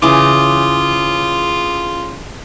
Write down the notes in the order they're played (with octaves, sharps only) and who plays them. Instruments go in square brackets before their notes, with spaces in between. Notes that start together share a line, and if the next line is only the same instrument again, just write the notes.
[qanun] C#3 E3 [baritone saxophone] F4 [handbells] D6 D#6